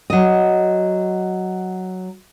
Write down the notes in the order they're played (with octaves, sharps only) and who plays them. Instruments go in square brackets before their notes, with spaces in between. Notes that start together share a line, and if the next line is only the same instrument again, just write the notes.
[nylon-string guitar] F#3 D#5